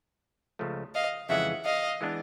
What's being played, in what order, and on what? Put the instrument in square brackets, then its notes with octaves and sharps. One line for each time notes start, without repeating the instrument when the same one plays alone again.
[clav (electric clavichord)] C#2 C#3 F3 A3
[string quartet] D#5 F5
[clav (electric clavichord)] F2 C#3 E3 G#3 [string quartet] E5 F#5
[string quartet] D#5 F5
[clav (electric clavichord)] E3 G#3 B3 D4